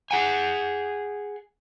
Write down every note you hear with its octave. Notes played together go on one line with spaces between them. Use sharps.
G#4 F#5 G#5